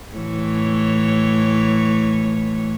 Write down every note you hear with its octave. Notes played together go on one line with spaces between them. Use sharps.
A2 E3 C#5